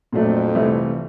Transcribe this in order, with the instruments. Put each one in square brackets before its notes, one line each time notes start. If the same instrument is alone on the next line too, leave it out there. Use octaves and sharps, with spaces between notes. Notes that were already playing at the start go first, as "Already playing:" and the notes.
[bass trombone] F2 [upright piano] A#2 F#3 A3 D4
[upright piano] C2 C3 E3 A3